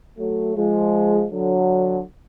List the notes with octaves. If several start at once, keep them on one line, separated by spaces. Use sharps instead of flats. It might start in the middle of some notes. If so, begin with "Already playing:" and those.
F#3 A3
F3 G#3
D3 F#3